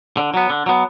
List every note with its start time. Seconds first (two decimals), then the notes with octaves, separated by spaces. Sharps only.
0.17 D3
0.34 F#3 B3
0.50 D3
0.66 F#3 B3